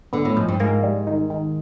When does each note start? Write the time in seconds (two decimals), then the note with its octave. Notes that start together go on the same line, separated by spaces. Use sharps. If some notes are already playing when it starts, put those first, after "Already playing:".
0.13 D3 B3
0.25 A2
0.37 G#2 F3
0.49 G2
0.60 G#2 A#3
0.83 G3
1.07 D#3
1.30 D#3